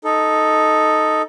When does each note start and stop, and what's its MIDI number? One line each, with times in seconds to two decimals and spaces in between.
0.04 1.22 63
0.04 1.22 69